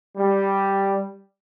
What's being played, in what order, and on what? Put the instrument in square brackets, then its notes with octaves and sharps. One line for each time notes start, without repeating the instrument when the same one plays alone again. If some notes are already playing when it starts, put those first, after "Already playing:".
[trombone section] G3